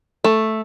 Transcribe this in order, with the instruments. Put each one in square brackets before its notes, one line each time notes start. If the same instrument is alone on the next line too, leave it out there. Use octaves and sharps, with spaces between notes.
[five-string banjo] A3